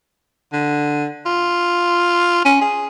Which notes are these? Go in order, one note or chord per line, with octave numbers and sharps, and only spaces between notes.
D3
F4
C#4
G#4